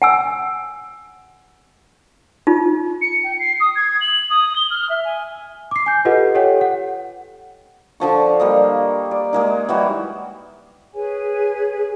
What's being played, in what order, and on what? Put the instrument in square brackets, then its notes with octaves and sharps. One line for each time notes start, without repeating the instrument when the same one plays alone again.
[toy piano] F#5 G#5 E6
D#4 F4
[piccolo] C#7
G5
C7
D#6
G#6
F#7
D#6
G7
F6
E5
G#5
[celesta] D6 C7
G#5 G6
F4 G4 A4 B4 D#5 F#5
G4 A4 C#5 F#5 G5
F#5
[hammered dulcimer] D3 F3 C#6
G3 A#3 D#5
D5
G#3 A#3 D#4
E3 F#3 G3 F#4
[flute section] G#4 B4 C#5 G#5